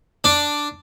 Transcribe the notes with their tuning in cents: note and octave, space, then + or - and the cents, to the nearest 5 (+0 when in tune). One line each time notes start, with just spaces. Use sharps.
D4 +0